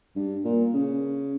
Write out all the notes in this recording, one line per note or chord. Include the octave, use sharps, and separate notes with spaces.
G2
A#2
C#3